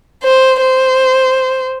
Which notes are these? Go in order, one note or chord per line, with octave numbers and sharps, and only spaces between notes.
C5
C5